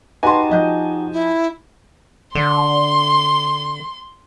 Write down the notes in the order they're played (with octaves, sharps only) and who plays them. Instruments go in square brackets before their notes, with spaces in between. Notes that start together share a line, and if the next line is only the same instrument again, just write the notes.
[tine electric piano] D#4 F#4 G4 [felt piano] B4 C6 [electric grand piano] G#5 A5
[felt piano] F3 D#5 G6
[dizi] E4
[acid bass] D3 [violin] C6